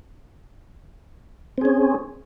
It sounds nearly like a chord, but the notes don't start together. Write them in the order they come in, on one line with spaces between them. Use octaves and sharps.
C4 G#4 C#4